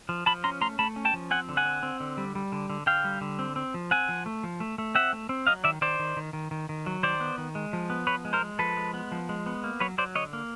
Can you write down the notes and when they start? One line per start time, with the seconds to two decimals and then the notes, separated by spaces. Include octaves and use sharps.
0.09 F3
0.26 F3 A5 B5
0.44 C#4 A#5 C6
0.61 A3 A#5 C6
0.79 A3 A5 B5
0.96 C#4
1.05 G5 A5
1.13 F3
1.31 C4 F#5 G#5
1.49 D3
1.57 F#5 G#5
1.65 C4
1.83 C4
2.00 D3
2.18 G3
2.35 G3
2.52 D3
2.70 D3
2.86 D3 F5 G5
3.04 G3
3.21 D3
3.39 C4
3.56 C4
3.74 F3
3.91 C4 F#5 G#5
4.09 F3
4.26 A3
4.43 F3
4.60 A3
4.78 A3
4.95 C4 E5 F#5
5.13 A3
5.29 C4
5.47 F#3 D#5 F5
5.64 D#3 D5 E5
5.81 D#3 C5 D5
5.99 D#3
6.17 D#3
6.33 D#3
6.51 D#3
6.69 D#3
6.86 F#3
7.03 D#3 C5 D5
7.20 B3
7.38 D#3
7.55 G#3
7.73 F3
7.90 B3
8.07 F3 B4 C#5
8.25 G#3
8.33 A#4 C5
8.42 G#3
8.59 F3 A4 B4
8.77 G#3
8.94 B3
9.12 F3
9.29 G#3
9.46 B3
9.64 A#3
9.80 F#3 B4 C#5
9.98 F#3 C5 D5
10.15 D3 C#5 D#5
10.33 A#3